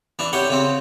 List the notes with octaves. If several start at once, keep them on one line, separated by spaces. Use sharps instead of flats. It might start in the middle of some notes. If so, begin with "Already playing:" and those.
E3 D4
C3 G4 C#5 F#5
C#3 C4